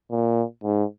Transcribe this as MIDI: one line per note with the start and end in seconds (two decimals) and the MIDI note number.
0.11 0.43 46
0.64 0.84 44